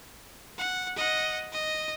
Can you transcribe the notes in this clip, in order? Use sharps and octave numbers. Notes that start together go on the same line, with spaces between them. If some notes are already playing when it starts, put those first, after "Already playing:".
F#5
D#5 F#5
D#5